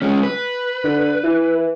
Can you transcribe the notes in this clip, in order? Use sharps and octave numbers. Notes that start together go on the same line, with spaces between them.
G#3 C#4
B4
D3
E3